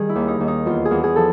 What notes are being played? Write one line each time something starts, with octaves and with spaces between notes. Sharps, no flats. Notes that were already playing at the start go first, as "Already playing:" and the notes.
Already playing: D#3 G3 G#4
E4
D#2
D#4
D#2
D#4
E2 F4
G#4
E2
G#4
F3 A4